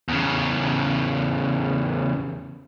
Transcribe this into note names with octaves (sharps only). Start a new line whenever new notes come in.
E2 C#3